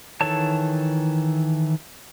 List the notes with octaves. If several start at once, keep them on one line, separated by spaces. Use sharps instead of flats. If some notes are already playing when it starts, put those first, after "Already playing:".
D#3 E3 A4 C#5 A5